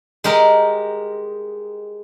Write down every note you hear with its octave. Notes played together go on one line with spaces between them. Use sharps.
G#3 G4 A#4 D#5